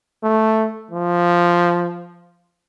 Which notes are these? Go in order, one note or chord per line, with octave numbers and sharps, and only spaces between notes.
A3
F3